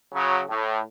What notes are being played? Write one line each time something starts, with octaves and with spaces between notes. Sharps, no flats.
C#3 F#3
A2